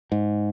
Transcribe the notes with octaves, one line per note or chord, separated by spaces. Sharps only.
G#2